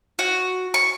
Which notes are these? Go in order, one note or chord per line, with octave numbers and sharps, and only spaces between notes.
F#4
C#6